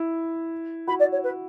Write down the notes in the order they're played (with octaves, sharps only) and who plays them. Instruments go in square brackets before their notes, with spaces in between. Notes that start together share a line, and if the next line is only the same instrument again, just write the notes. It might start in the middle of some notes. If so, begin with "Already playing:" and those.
Already playing: [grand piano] E4
[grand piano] F#4 [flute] B5
[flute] D5
C#5
B4